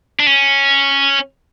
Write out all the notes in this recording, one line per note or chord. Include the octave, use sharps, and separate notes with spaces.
D4
C#4